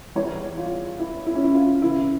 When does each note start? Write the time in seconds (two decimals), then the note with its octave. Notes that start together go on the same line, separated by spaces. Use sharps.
0.15 E2 E3 G3 C#5
0.57 F4
0.99 E4
1.26 E4
1.35 C#4
1.44 E4
1.55 F4
1.82 E2 C#3 E3 E4